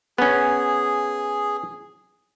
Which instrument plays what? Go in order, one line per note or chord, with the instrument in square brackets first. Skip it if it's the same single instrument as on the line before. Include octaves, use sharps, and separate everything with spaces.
[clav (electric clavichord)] B3 C#4 [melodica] G#4